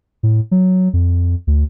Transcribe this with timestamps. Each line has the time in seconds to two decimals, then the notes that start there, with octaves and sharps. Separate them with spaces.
0.23 A2
0.51 F#3
0.93 F2
1.47 D2